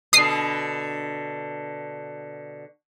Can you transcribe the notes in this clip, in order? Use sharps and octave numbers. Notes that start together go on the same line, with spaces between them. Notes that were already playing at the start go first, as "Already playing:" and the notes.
B2 D3 D#6 C7